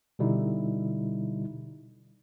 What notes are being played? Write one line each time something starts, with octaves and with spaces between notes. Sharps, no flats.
B2 D3 G3 D#4 E4